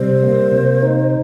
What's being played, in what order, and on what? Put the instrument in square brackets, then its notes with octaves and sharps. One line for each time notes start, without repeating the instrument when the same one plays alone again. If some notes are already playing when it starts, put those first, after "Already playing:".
Already playing: [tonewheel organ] C3 G3 [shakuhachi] C5
[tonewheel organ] A#3
C3
D#4